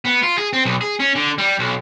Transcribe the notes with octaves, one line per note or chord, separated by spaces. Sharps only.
B3
F4
G#4
C4
B1
G#4
C#4
D3
G3
B1